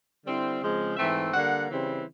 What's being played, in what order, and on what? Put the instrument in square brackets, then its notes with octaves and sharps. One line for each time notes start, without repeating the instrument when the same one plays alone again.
[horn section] D3 G3 C4 E4
C#3 F3 G#3 C4
G#2 E3 A3 C4 E5
D3 G3 A#3 F#5
C#3 E3 G3 C4 E4